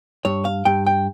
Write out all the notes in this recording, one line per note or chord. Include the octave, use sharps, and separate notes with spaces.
G2 C#5
F5
G2 G5
G5